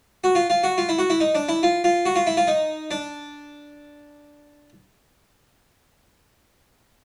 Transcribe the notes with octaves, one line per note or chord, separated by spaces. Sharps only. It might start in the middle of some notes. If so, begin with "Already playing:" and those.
F#4
F4
F4
F#4
F4
E4
F#4
E4
D#4
D4
E4
F4
F4
F#4
F4
E4
F4
D#4
D4